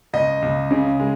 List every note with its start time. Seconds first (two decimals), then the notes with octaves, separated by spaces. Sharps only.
0.13 C#2 D#5
0.42 C#2
0.71 C#3
1.00 G#3